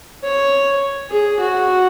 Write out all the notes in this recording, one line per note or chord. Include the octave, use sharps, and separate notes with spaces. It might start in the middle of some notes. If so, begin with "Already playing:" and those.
C#5
G#4
F#4